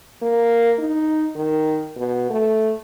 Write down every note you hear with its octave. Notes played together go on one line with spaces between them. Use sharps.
A#3
D#4
D#3
B2
A3